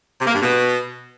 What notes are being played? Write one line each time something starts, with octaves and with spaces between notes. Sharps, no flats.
C3
A#3
G2
B2